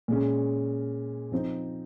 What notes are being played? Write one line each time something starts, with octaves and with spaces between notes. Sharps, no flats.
A#2 G#3 C#4
F3 C4 D#4